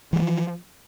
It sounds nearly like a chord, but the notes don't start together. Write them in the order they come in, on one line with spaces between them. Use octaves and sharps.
E3 G3 A3 F3